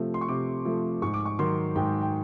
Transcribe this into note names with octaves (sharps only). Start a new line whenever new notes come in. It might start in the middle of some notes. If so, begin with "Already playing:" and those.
Already playing: C3 F3 A3
C6
C#6
C3 D6
F3 A3
G#2 C#6
D6
C#6
D#3 F#3 C6
G#2 G5
G5